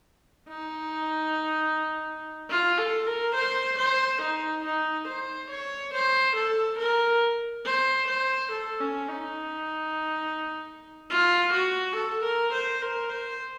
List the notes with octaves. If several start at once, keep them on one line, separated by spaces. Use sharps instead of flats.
D#4
F4
A4
A#4
C5
C5
D#4
D#4
C5
C#5
C5
A4
A#4
C5
C5
A4
C#4
D#4
F4
F#4
A4
A#4
C5
A#4
C5